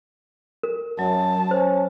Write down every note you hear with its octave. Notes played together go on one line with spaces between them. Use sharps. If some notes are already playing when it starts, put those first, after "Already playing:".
A#4
F#2 F#3 A5
C#4 C5